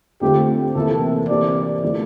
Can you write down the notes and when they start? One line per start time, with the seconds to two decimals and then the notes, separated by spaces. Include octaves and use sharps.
0.21 D3 A3 C4 F4 G4
0.75 C3 E3 A#3 E4 A4
1.29 E3 A#3 D4 G4 C5 D5
1.83 E3 A3 D4